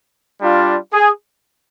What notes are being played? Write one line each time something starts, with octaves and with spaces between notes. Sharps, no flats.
G3 D4 F4
G#4